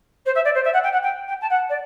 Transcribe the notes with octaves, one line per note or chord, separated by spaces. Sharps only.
C5
E5
D5
C5
E5
F#5
G5
F#5
G5
G5
A5
F#5
D5